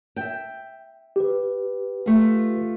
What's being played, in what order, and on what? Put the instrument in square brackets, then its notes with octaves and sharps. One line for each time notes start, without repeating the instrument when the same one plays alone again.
[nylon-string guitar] E5 G5
[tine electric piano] G4 B4
[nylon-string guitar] A3 F4